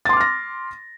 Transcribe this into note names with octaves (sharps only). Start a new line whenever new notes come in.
C6 D6 F6 A6 A#6